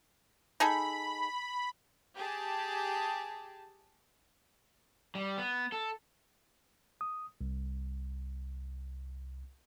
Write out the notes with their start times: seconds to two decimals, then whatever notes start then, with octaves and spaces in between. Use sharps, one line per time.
0.60 D#4 G#4 A4 B5
2.17 G4 G#4 A5
5.15 G3
5.38 B3
5.72 A4
7.01 D#6
7.41 C2